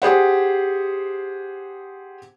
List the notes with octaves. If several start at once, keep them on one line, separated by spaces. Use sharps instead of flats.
G4 G#4 C5 F#5